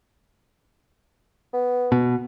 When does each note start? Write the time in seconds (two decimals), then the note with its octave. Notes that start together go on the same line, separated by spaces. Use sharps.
1.54 B3
1.92 B2